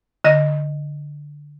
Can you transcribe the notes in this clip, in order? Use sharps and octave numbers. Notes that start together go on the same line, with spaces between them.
D3 D#5 A#6